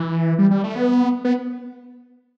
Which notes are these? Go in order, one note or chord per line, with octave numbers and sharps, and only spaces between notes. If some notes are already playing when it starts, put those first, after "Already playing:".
Already playing: E3
G3
G3
A3
B3
B3